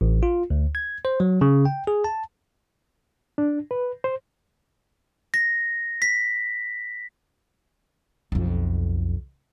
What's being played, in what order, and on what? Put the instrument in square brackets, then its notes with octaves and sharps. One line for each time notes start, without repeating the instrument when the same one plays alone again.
[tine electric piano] A1
F4
D2
G#6
C5
F#3
C#3
G5
G#4
A5
[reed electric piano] D4
B4
C5
[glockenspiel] A#6
B6
[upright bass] B1 F2